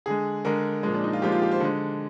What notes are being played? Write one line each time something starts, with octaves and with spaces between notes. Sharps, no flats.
D3 G#3 G#4
D3 G#3 A#4
A#2 F3 G#3
D4
D#4
F4
A#2 F3 G#3 G4
F4
G4
C5
D3 G#3